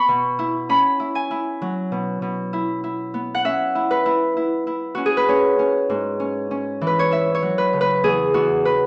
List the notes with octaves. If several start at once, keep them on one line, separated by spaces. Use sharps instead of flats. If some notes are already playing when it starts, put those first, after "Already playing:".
Already playing: B3 B5 C#6
B2
E4
C#4 B5
E4
G#5
E4
F#3
B2
B2
E4
E4
B3
F#5
C#4 E5
E4
B4
E4
E4
E4
C#4 F#4
G#4
B4
C#4 C#5
C#4
G#2
C#4
C#4
E3
B4
C#5
E4 E5
C#5
F#3
B4
C#3
B4
E2 G#4
E2 F#4
B4